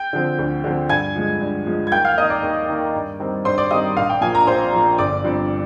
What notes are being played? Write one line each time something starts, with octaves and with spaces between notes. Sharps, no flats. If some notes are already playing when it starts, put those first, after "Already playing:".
Already playing: G5 G6
D3 F3 C4
D2
D3 F3 C4
G2 G#5 G#6
F3 G#3
G2
F3 G#3
G#6
D#2 G5 G6
F5 F6
D#3 A#3 D#5 D#6
D5 D6
D#2
D#3 A#3
G2
D#3 G3 C4
G2 C5 C6
D5 D6
D#3 G3 C4 D#5 D#6
A#1 F5
G5
A#2 F3 G#5
A#5
A#1 C5 C6
A#2 F3
G1 D5 D6
G2 F3 C4